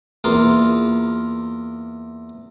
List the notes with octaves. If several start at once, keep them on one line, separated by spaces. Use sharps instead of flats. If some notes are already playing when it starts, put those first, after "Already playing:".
E2 A#3 F4